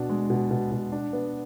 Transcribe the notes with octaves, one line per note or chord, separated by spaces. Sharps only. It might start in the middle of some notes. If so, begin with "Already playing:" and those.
Already playing: B2 D4
G#3
B2
B2
B2
D4
B3